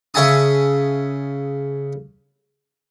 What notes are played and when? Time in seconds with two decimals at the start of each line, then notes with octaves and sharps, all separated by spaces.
0.14 C#3 E5 G#5 A5 D#6